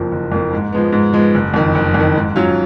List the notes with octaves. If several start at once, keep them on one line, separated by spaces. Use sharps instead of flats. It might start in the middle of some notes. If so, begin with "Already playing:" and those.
Already playing: F#1 F2 F3 A#3
F#1
F2 F3 A#3
G#2
F3 G#3 B3
G#2
F3 G#3 B3
F#1
F2 D#3
F#1
F2
D#3
G#2
F#3 C#4 F4